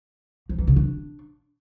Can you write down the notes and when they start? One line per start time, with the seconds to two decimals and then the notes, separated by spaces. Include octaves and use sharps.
0.49 F3
0.58 E3
0.67 C#3
0.76 D4